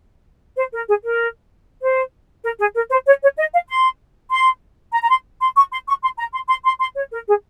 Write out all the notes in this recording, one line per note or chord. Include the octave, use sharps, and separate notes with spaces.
C5
A#4
G#4
A#4
C5
A#4
G#4
A#4
C5
C#5
C#5
D#5
F5
C6
C6
A#5
A#5
C6
C6
C#6
C6
C#6
C6
A#5
C6
C6
C6
C6
C#5
A#4
G#4